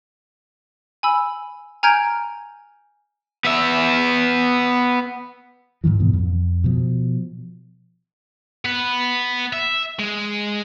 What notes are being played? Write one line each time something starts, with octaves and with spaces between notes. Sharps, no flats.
G#5 B5 E6
G#5 A#5 F6 G6 G#6 D7
B3 E5
G#2 C3 D#3 E3
G#2 B2 E3
F2
B2 F3
B3 B4
E5
G#3